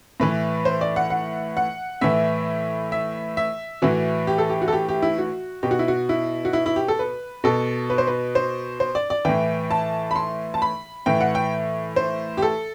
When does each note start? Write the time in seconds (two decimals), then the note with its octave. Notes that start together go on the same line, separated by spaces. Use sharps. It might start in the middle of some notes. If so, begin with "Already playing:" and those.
0.20 A2 E3 B4
0.65 C5
0.81 D5
0.96 F#5
1.10 F#5
1.57 F#5
2.01 A2 E3 E5
2.92 E5
3.37 E5
3.82 A2 E3 F#4
4.27 G4
4.38 A4
4.50 G4
4.62 F#4
4.68 A4
4.73 G4
4.89 G4
5.02 E4
5.18 F#4
5.63 B2 G4
5.71 F#4
5.79 E4
5.88 F#4
6.09 E4
6.45 F#4
6.53 E4
6.66 E4
6.76 G4
6.88 A4
6.99 B4
7.44 B2 A4
7.90 B4
7.98 C5
8.07 B4
8.35 C5
8.80 C5
8.95 D5
9.10 D5
9.25 A2 E3 G5
9.71 A5
10.11 B5
10.16 C6
10.54 A5
10.62 B5
11.06 A2 E3 G5
11.20 F#5
11.35 G5
11.96 C5
12.37 G4
12.42 A4